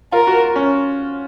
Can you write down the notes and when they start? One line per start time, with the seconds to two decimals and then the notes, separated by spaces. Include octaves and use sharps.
0.12 F4 A#4
0.27 F#4
0.56 C#4